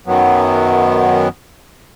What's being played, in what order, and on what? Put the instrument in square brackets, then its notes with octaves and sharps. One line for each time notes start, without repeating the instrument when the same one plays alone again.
[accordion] F#2 D#3 F#3 B3